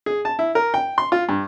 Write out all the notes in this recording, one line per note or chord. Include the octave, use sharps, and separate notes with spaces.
G#4
A5
E4
A#4
G5
C6
F4
G2